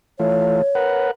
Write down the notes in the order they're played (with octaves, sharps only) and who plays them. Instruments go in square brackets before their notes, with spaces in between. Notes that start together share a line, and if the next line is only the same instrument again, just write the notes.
[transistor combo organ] E3 A3 F4 [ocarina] C#5
[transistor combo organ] A#4 B4 F#5